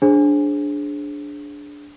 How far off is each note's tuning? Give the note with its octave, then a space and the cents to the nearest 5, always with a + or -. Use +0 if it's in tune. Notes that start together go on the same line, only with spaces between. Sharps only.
D4 -10 G#4 +0 C5 +20